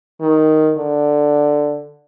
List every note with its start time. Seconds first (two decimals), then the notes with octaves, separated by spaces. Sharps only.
0.21 D#3
0.77 D3